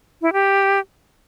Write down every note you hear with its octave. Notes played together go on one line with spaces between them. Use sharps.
E4
G4